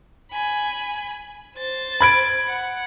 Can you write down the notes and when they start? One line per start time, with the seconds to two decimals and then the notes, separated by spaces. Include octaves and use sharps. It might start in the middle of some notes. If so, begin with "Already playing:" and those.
0.32 G#5 B5
1.57 C5 A6
2.01 B5 G#6 D7
2.47 F#5